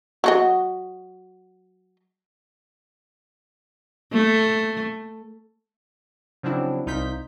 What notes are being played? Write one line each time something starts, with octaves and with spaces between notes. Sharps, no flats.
F#3 F#4 D#5
A3
C#3 F3 F#3 C4 D4 E4
C2 D#4 F4 G6 B6